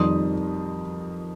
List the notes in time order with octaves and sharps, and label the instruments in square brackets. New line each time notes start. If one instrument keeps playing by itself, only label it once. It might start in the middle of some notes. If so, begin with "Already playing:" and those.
Already playing: [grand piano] F2 D#3 G3 C6 D#6